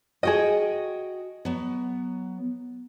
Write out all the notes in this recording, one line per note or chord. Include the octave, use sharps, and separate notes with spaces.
F#4 G#4 D#5 G5
F#3 B3